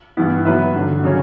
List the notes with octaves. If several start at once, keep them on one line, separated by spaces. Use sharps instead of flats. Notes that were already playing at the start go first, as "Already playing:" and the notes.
G2 E3 B3 E4
F#3 B3 E4 B4 E5
G2 D3 F#3
C#3 F#3 C#4